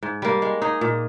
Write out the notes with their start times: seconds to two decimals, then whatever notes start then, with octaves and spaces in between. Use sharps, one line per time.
0.03 G#2
0.22 G3 A#3
0.42 G#3
0.62 D#4 G#4
0.81 A#2